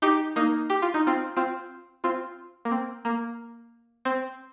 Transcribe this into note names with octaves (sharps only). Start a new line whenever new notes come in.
D#4 G4
A#3 D#4
G4
F4
D#4
C4 F4
C4 F4
C4 F4
A#3
C4
A#3
C4